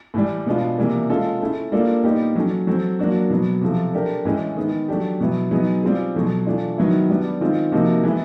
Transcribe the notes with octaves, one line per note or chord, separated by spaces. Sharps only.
A2 E3 G3
B2 G#3 B3 D4 F4
C3 E3 G3 A#3
G#3 C#4 F4 A4
A3 C#4 E4
G3 A#3 D4 F4 A4
A#2 G3 B3 D#4 G4
F#3 A3 C#4
F#3 A3 C4
F#3 A#3 D4 F#4
B2 F#3 B3
C3 F3 A3
A3 D4 G4 A#4
A2 E3 G#3 C#4
D#3 G#3 B3
F#3 A3 D4 G4
B2 F#3 B3 E4
F#3 B3 D#4 G#4
G3 C4 F4 G#4
B2 F#3 A3
E3 A3 D4 F4
D#3 F#3 B3 E4
G3 B3 D4
D#3 G#3 C4 F4
C3 F3 A#3 D#4 F#4
E3 G#3 B3 E4